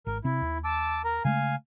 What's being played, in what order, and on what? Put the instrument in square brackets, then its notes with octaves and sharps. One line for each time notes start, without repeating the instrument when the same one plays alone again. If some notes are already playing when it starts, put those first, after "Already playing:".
[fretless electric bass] G#1 [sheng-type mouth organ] A#4
[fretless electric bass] C3 C4 [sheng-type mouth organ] E4
[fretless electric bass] D#2
[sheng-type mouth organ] A5 D6 E6
A#4 A#5
[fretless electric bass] C#3 G#3 A3 [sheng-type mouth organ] F5 G#5